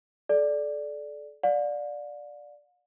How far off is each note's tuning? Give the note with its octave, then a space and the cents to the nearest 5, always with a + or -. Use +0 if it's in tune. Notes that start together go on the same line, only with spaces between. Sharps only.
A4 -30 D5 +0
D5 +0 F5 +45